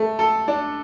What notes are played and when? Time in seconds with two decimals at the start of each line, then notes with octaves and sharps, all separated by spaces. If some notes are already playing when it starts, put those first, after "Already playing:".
Already playing: A3
0.19 A4
0.48 D4